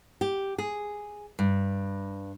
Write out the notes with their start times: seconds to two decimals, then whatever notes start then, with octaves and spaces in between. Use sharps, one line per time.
0.21 G4
0.58 G#4
1.39 G2